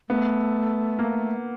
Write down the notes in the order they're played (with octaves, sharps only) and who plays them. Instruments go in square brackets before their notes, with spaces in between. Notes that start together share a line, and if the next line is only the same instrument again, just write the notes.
[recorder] A3 [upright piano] B3
[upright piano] A#3